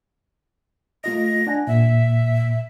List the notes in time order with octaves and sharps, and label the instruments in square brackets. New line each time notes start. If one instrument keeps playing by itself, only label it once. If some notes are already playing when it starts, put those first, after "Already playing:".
[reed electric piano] A3 F4 D#5 [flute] A#6
[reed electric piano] D4 F#5 G#5
[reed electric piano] A#2 [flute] E5